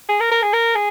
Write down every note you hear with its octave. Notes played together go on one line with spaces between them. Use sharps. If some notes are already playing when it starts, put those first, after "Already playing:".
G#4
A#4
A#4
G#4
A#4
G#4